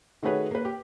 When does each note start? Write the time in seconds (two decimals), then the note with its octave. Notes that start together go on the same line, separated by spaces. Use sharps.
0.23 D#3 A3 F#4 G#4 B4 C#5
0.51 A#3 B4
0.65 G4